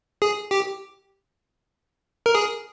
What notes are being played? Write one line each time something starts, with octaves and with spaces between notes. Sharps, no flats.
G#4
G4
A#4
G#4